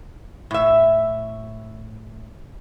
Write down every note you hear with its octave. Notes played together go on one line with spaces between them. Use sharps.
A2 E5